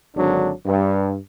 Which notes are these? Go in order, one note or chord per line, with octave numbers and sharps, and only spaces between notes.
G#1 D3 F#3 D4
G2